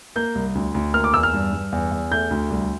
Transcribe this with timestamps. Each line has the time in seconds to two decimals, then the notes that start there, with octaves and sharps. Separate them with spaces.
0.16 A#3 G6
0.35 C2
0.55 D2
0.74 D2
0.94 A#3 F6
1.04 D6
1.14 E2 E6
1.23 F6
1.33 G2
1.53 G2
1.72 E2
1.92 E2
2.11 A3 G6
2.31 D2
2.50 C2